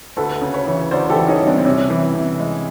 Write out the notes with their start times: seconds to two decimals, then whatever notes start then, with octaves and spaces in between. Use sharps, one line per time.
0.17 D2 A4 B4
0.41 C#3
0.54 B4 C#5
0.67 E3
0.91 D2 C5 D5
1.10 G4 A4
1.15 E3
1.28 C#4 D#4
1.40 G3
1.47 C4 D4
1.58 C4
1.65 C3 C#4
1.90 E3
2.15 C3
2.40 G#3